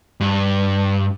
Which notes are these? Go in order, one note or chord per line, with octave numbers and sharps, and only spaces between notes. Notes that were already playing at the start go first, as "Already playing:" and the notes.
G2